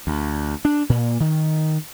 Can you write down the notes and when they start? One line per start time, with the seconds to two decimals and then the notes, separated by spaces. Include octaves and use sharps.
0.07 D2
0.65 D4
0.89 A#2
1.20 D#3